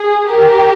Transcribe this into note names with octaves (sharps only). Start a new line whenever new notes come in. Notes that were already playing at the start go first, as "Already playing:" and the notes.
Already playing: G#4
G4 A#4